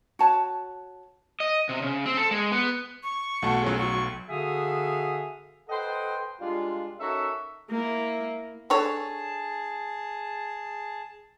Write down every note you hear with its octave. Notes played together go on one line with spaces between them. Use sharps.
F#4 C#5 A5
D#5
C3
C#3
C4
A4
G#3
B3
C#6
B1 A3 F#4 F#5 A5
F#3 C#4 G#4
F#3 C#6
D3 F#4 G#4 E5 F5 D#6
A4 B4 C5 D#5 F#5 G5
G3 G#3 D4 F4
C#4 D#4 F#4 A4 A#4 E5
A#3 E4
D4 G#4 A4 C#5 A5